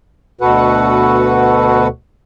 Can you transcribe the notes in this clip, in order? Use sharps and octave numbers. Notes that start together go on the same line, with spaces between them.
D2 B2 F#4 A4 B4 F#5